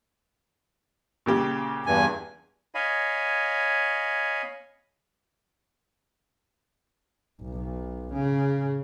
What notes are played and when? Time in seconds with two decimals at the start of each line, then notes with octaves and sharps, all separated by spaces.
1.26 A#2 C#3 G4
1.86 E2 G2 G#5
2.75 C#5 D#5 F5 G#5 B5
7.42 B1
8.13 C#3